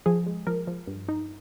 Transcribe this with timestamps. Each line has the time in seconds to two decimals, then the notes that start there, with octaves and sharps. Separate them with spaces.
0.06 F3 G#4
0.26 G#3
0.47 F3 A#4
0.67 F3
0.87 G2
1.08 D#4